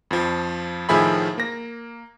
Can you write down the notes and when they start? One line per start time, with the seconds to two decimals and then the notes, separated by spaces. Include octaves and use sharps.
0.11 F2 F3
0.89 A2 D#3 F3 G#4 E5 B5
1.38 A#3 A#6